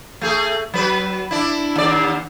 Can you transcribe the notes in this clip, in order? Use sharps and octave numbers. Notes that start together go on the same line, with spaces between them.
A3 G#4
F#3 B4
D4 E4
D#2 D5